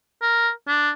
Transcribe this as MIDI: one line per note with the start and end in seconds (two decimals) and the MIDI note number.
0.22 0.50 70
0.68 0.90 62